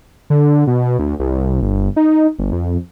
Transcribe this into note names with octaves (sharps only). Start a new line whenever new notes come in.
D3
B2
D2
C2
G1
D#4
G1
F2